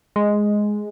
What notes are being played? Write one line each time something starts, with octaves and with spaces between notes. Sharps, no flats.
G#3